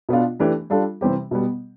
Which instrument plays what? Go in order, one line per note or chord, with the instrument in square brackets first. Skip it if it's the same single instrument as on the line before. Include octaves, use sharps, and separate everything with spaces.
[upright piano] B2 B3 D4 F4
E3 A3 D4 G4
G3 D4 F4 A4
C3 E3 G3 C4 G4
B2 G3 B3